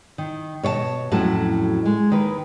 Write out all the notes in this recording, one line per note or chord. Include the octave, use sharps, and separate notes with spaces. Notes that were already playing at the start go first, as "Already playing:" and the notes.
D#3
B2 C#5 D5 A5
F2 A2 F#3 C#4 F#4 A5
G#3
D#2 D#3 B4